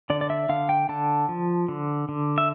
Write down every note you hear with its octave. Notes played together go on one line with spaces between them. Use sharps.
D3 D5
D5
E5
D3 F5
G5
D3 A5
F3
D3
D3
E5